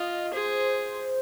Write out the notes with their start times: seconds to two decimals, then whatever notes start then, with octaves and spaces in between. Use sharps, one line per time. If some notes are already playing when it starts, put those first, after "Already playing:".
Already playing: F4 D#5
0.33 G#4 C5